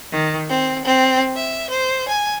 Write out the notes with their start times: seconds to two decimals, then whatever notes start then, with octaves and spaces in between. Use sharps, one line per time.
0.12 D#3
0.49 C4
0.85 C4
1.36 E5
1.70 C5
2.08 G#5